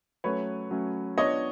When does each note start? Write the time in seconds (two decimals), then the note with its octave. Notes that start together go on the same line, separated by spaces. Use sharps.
0.24 F#3 A3 C#4 B4 C#5
0.71 F#3 A3 C#4
1.18 B3 D4 F4 C#5 D#5